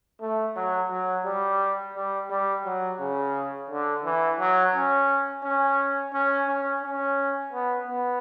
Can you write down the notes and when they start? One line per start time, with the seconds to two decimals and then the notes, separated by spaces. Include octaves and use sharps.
0.21 A3
0.56 F#3
0.91 F#3
1.25 G3
1.95 G3
2.30 G3
2.65 F#3
3.00 C#3
3.70 D3
4.04 E3
4.40 F#3
4.74 C#4
5.44 C#4
6.13 C#4
6.48 C#4
6.83 C#4
7.53 B3
7.87 B3